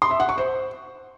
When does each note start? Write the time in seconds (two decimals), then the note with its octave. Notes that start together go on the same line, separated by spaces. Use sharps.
0.02 C6
0.11 E5
0.20 F#5
0.29 C#6
0.38 C5